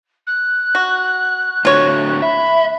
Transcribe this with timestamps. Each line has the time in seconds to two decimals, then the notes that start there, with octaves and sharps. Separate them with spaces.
0.27 F#6
0.75 F#4
1.65 A2 D3 F4 F#4 C#5
2.22 E5 B5